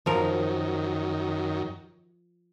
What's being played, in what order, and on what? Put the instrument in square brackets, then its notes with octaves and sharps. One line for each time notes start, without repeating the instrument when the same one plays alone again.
[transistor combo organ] F#2 D#3 [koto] F3 A#4